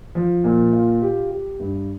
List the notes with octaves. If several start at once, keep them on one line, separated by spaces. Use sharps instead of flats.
F3
A#2
F4
G4
G4
G2